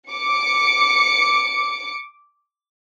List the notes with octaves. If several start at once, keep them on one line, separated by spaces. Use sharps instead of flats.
D6 C#7